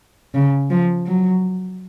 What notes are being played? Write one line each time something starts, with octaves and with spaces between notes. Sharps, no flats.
C#3
F3
F#3